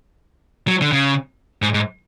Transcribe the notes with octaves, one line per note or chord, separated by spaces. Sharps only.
F#3
D3
C#3
G#2
G#2